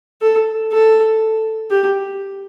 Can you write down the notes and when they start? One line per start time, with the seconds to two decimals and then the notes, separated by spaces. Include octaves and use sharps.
0.21 A4
0.72 A4
1.71 G4